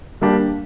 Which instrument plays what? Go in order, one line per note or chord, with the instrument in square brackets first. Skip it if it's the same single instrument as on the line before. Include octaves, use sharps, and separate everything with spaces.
[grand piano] G3 A#3 D4 G4